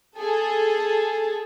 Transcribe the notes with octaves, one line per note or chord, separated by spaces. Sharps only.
G#4 A4